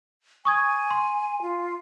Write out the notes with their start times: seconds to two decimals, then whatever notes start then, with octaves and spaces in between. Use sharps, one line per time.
0.45 G#5 C#6 D#6 G#6
0.90 C6
1.42 F4